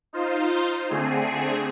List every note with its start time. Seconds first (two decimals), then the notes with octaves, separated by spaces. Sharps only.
0.13 D#4 F4 C5
0.89 D3 A3 C4 G#4